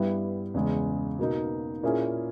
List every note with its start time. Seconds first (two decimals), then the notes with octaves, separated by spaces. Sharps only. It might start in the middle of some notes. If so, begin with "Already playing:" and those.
Already playing: G2 G3 B3 E4
0.54 E2 C#3 G#3
1.19 B2 A#3 D#4
1.83 A#2 A#3 C#4 E4 G#4